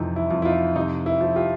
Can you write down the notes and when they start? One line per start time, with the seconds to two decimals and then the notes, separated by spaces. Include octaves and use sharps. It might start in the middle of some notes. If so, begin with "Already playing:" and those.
Already playing: F2 C3 E3 D#4
0.16 E4
0.31 F2
0.42 E4
0.45 D#4 F4
0.76 C3 D#4
1.06 E4
1.21 F3
1.36 F4 G4